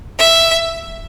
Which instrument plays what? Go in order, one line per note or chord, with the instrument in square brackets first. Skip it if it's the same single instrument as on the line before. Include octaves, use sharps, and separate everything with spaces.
[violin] E5